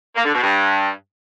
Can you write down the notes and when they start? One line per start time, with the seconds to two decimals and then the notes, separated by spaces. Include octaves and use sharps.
0.16 A#3
0.25 D3
0.34 B2
0.43 G2